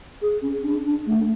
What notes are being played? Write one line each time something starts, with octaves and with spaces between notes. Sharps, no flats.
G#4
C#4
D4
D4
A3